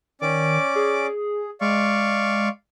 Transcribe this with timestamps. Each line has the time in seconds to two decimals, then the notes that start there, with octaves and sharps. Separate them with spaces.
0.21 D#3 C#4 D5 D6
0.75 G#4
1.61 G#3 D5 F5 C#6